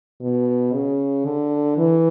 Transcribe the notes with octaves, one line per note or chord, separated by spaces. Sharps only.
B2
C#3
D3
E3